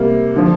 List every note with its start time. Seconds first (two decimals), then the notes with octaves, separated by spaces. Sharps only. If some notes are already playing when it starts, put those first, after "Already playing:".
Already playing: C3 G3 A#3
0.36 D3 F3